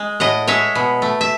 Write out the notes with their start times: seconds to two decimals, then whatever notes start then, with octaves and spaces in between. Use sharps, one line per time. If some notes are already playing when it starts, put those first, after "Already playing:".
Already playing: G#3 G#5
0.20 A2 D#5 F#5
0.48 G#3 C#5 E5
0.75 B2
1.02 A3
1.21 E5